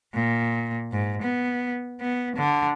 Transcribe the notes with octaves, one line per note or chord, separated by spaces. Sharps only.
A#2
G#2
B3
B3
D3